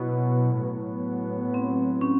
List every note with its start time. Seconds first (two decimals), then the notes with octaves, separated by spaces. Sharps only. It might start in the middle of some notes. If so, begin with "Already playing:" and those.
Already playing: B2 F#3 B3 E4
0.60 A2 F#3 B3
1.54 C4
2.01 C#4